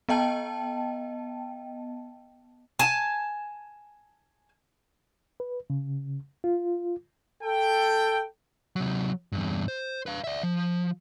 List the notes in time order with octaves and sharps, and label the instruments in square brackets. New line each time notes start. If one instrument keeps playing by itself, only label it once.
[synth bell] B3 D#5 G5 A5
[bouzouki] G#5 A5
[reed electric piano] B4
C#3
F4
[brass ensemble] A4 G5
[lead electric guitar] C3 F#3
E2 G2
C5
B4 F5
D5 E5
F3